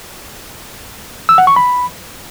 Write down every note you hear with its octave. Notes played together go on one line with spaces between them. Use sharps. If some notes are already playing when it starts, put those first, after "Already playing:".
E6
F#5
C#6
B5